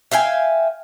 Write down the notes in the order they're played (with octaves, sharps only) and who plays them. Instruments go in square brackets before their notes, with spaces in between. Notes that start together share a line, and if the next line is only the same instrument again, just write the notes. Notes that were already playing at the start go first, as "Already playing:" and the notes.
[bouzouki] E5 F5 G5 G#5